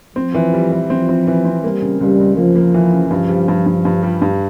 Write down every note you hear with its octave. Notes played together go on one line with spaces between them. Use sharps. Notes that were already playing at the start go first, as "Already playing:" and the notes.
F3 C4
E3
G3
E3
F3 C4
C4
E3
C4
G3 A#3
C#3
C#2 G3
C#2
F3 A#3
A#3
E3
C#3
G2 F3
G3
G2
G2
G2
G3
G2